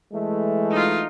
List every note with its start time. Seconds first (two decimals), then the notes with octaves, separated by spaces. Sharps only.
0.12 E3 G#3 A3
0.71 D#4 F4